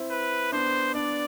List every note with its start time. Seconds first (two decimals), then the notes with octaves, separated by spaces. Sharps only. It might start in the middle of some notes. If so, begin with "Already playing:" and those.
Already playing: C4 E4
0.11 B4
0.52 B3 D4 C5
0.94 B3 D4 D5